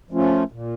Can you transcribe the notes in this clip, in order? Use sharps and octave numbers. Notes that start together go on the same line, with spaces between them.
F3 A3 C#4 F4
A#2